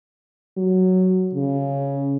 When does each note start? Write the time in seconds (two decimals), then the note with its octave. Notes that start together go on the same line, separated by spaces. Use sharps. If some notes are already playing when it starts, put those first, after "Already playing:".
0.57 F#3
1.34 C#3